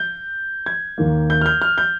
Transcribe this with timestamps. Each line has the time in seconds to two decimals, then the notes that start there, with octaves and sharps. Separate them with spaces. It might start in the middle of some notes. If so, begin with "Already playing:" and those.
Already playing: G6
0.66 G#6
0.98 D#2 D#3 A#3
1.30 G6
1.41 F6
1.46 G6
1.62 F6
1.78 G6